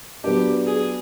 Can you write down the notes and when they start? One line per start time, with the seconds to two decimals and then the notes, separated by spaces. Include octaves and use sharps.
0.24 F#3 B3 D4 G4
0.66 G#4